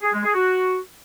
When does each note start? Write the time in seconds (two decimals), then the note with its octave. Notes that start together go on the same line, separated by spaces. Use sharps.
0.02 G#4
0.13 G#3
0.24 G#4
0.34 F#4